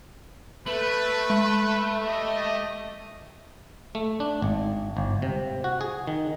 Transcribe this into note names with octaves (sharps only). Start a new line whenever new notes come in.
A3 B4 F#7
G#3
G4 D#5
A3
D4
G#1
G1
C3
F#4
G#4
D#3